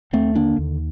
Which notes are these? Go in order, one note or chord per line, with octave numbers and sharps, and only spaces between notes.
D#2 A3 C4
D3 A#3 D4
D#2